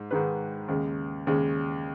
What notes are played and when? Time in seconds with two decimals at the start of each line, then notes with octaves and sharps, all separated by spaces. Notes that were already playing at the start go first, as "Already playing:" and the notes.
Already playing: G#2
0.11 G#2 D#3 G#3 B4
0.68 D#2 C#3 G#3
1.27 D#2 C#3 G#3